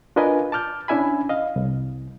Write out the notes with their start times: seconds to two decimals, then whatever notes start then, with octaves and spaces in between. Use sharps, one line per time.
0.16 D4 F4 A#4 B4 D#5 G#5
0.52 A5 D6 F6 G6
0.88 C#4 D4 E4 E5 G#5 B5
1.29 D#5 F5
1.56 C2